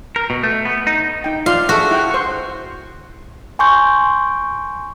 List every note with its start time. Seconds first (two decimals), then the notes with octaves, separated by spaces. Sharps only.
0.16 A#4
0.30 B2
0.43 A3
0.65 B3
0.87 D#4
1.24 D#4 G5
1.46 F4 D5 F5 C6
1.69 F#4 G#4 A4 E5
1.91 E4 F#5 G5
2.11 C5 C#6
3.59 G#5 C6 C#6 G6